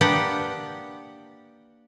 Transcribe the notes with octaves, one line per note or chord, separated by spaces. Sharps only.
A#3 B3 D4 G4 F#5